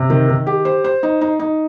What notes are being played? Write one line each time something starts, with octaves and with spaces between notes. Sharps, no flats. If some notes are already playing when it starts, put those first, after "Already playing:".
Already playing: C3
D#3
D#3
G4
C5
C5
D#4
D#4
D#4